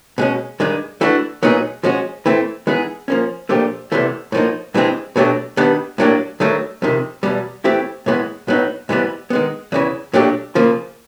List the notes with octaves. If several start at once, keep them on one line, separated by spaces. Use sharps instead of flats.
B2 G#3 C#4
G2 D#3 G#3
E3 A3 D4 F#4
A#2 F#3 B3 D#4 G#4
F3 G#3 C#4 F#4
E3 A3 C4
E3 G#3 B3 D#4 G#4
F3 A#3 C#4
A#2 F3 A3 D4 G4
E2 C3 E3 A3
A2 F3 A#3 D#4
G2 E3 G#3 C4
B2 F#3 A3 D4 G4
G2 D#3 G3 B3
A2 F#3 A#3 D4 G4
G2 D#3 F#3 A3
F2 C3 D#3
E2 B2 G3
E3 A3 C4 E4 G4
A2 E3 G#3 B3
A2 F#3 B3 D#4
G#2 E3 G3 B3
D#3 G#3 B3
E2 C#3 E3
A#2 F#3 A3 D4 G4
C#3 F3 A#3